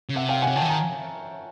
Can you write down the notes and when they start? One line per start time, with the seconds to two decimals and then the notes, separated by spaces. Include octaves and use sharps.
0.09 C#3
0.15 C3 E5 F#5
0.29 F5 G5
0.42 C3 F#5 G#5
0.56 C#3 G5 A5
0.62 E3
0.66 D#3 G#5 A#5